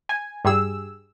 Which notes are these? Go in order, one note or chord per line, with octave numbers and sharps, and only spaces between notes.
G#5
G2 G3 G#4 E6